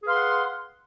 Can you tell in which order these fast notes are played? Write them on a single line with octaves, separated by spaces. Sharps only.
G#4 B4 F5 C6 F#5